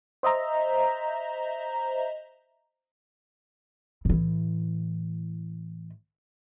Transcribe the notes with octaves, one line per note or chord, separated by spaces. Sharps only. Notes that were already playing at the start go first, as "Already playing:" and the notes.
C5 D#5 E5 A#5
A2 E3